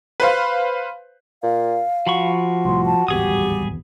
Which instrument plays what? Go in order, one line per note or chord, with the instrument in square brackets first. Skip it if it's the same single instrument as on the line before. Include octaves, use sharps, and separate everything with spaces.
[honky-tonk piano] B4 C5 F5
[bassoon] A#2 [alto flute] F5
[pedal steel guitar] F3 B5 C#6 [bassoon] F#4
[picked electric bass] C2 A2 [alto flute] C6
[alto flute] A5
[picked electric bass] D1 G#1 E2 [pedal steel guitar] G3 G#4 D#6 [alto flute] G4